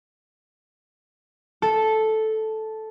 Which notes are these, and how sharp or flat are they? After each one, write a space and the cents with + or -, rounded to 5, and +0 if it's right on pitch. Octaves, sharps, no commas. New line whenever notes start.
A4 -5